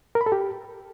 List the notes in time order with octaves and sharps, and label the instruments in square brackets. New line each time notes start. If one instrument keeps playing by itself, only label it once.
[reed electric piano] A#4
B5
A4
G4